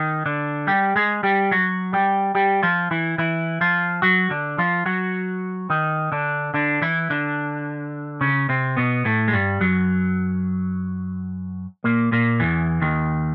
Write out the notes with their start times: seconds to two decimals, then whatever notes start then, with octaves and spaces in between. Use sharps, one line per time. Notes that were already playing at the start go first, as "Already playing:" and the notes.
Already playing: D#3 D#4
0.26 D3 D4
0.67 G3 G4
0.96 G#3 G#4
1.23 G3 G4
1.51 F#3 F#4
1.93 G3 G4
2.35 G3 G4
2.63 F3 F4
2.91 E3 E4
3.18 E3 E4
3.61 F3 F4
4.02 F#3 F#4
4.30 D3 D4
4.58 F3 F4
4.86 F#3 F#4
5.70 D#3 D#4
6.12 D3 D4
6.54 D3 D4
6.82 E3 E4
7.10 D3 D4
8.21 C#3 C#4
8.49 C3 C4
8.77 B2 B3
9.05 A2 A3
9.28 G#3
9.33 G2 G3
9.60 F#2 F#3
11.84 A#2 A#3
12.12 A#2 A#3
12.40 E2 E3
12.82 D#2 D#3